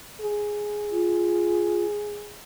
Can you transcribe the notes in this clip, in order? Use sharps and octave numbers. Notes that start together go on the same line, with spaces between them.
G#4
F4